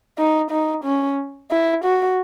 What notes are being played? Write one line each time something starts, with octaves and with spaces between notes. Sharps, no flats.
D#4
D#4
C#4
E4
F#4